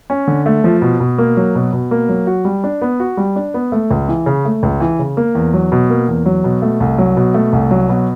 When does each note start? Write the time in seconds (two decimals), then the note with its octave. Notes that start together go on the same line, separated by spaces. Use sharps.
0.10 C#4
0.27 D3
0.46 A3
0.64 F3
0.82 B2
1.00 B2
1.18 A#3
1.37 F#3
1.55 B2
1.73 B2
1.91 A#3
2.09 F#3
2.27 F#4
2.45 G3
2.64 D4
2.82 B3
3.00 F#4
3.17 G3
3.36 D4
3.54 B3
3.72 A3
3.91 C#2
4.08 E3
4.26 C#3
4.45 A3
4.63 C#2
4.80 E3
4.99 C#3
5.17 A#3
5.35 E2
5.54 F#3
5.72 B2
5.90 A#3
6.08 E2
6.26 F#3
6.44 B2
6.62 A3
6.80 C2
6.98 F#3
7.17 B2
7.34 A3
7.53 C2
7.71 F#3
7.89 B2